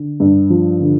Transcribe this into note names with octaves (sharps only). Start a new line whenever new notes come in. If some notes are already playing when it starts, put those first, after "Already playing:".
Already playing: D3
G2
F3
D3